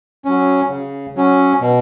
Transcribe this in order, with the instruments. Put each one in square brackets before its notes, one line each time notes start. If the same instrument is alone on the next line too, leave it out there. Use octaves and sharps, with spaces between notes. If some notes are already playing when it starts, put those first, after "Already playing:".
[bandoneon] F#3 C#4
C#3
F#3 C#4
B2